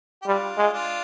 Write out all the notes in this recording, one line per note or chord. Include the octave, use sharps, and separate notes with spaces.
G4
G3 D4 F4
G#3
D4 F4